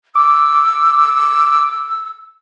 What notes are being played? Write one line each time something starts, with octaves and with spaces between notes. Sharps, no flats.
D6 E6